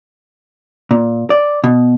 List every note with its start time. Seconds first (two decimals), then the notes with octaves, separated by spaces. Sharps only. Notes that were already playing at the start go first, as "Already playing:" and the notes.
0.91 A#2
1.30 D5
1.64 B2